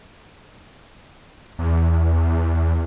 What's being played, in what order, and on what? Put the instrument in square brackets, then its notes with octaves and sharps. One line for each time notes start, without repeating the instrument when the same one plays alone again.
[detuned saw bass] E2